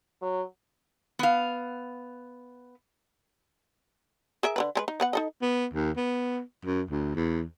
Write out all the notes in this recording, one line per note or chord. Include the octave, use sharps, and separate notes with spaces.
F#3
B3 F5
G#4 A#4 E5
D3 D#3 B4
G#3 D#4 B4
D#4
B3 B4 F#5
D#4 A4 D#5
B3
D#2
B3
F#2
D2
E2